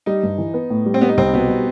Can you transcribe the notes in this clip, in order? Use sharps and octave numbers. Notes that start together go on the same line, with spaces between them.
G3 D#4
G2
E3
B3
A2
G3
C4
G3 B3
D#4
C2 C4
B2 B3
G3